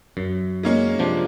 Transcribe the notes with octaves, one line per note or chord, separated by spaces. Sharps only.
F#2
G#3 A#3 C#4
C3 F3 D4